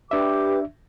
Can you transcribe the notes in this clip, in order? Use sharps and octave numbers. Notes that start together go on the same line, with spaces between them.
D4 G4 B4 E5 D6